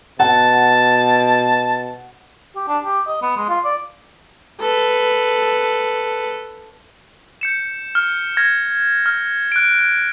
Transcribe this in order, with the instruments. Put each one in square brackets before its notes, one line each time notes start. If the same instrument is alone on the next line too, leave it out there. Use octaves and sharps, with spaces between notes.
[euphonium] B2 [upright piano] F#5 [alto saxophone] A5
[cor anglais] G4
D4
G4
D#5
B3
G#3
F4
D5
[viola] A4 B4
[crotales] G6 C#7 E7
F6
F6 G#6 A#6
F6
F#6 D7
F#6